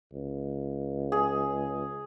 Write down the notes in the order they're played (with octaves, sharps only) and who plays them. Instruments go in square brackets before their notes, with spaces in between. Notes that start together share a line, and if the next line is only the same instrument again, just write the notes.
[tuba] C#2
[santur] G#4